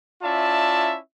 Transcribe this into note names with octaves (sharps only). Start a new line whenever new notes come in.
C#4 E4 F4 D5 E5 A5